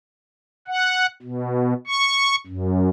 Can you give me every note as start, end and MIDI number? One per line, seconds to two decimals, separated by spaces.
0.68 1.06 78
1.22 1.73 47
1.87 2.36 85
2.47 2.89 42